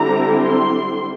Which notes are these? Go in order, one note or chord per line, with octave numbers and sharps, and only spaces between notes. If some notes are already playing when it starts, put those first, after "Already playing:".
Already playing: D3 G3 C4 E4 A#5
C6